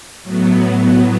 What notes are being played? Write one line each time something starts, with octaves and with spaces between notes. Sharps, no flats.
A2 F#3 B3